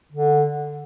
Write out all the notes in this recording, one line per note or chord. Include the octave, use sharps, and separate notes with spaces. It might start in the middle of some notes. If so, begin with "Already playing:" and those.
D3